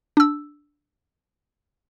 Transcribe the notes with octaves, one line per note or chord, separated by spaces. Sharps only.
D4 E6